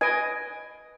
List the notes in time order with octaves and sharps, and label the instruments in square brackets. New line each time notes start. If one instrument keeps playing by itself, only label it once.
[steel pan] B4 D#5 G#5 [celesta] G#6 D7